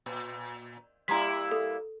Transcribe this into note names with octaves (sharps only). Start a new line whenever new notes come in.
A#2
G3 A#3 E4 A#5 C6 B6
A4